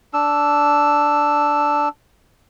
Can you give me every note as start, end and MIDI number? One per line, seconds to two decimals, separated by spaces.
0.14 1.89 62
0.14 1.89 88